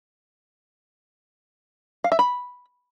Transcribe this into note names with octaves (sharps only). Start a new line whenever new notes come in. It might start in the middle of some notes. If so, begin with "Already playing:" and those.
F5
E5
B5